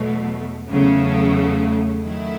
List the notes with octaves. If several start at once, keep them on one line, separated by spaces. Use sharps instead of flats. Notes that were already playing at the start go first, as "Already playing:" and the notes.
Already playing: E2 B2 F#3 A3
E2 C#3 F#3 A3
D#3 F#3 A3 E4